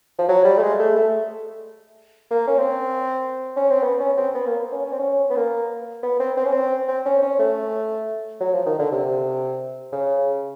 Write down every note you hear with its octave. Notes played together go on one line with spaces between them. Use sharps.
F3
F#3
G3
A3
G#3
A3
A3
A#3
C#4
C4
C#4
C4
B3
C#4
C4
B3
A#3
C#4
C#4
C4
C#4
B3
A#3
B3
C4
C4
C#4
C4
C4
C#4
C#4
A3
F#3
F3
D#3
D3
C3
C#3